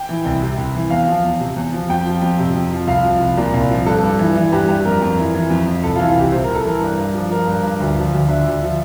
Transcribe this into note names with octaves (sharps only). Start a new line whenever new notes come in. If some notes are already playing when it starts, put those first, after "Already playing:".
Already playing: G5
E3
C2
C3
C2
E3
E2 F5
F3
E2
C3
E2
F3
F2 G5
F3
F2
C3
F2
F3
C2 F5
F3
C2
A#2
C2
F3
G2 A4
G2
E3
E3
G2 G4
G2 G4
F2 A#4
F2
E3
E3
F2
F2
C2 A4
F4
E3
F4
C2 G4
C3 C5
C2 A#4
A4
E3 A#4
G2
G2
F3
F3 A#4
G2
G2
D2
F3
D2
D3 E5
D2
F3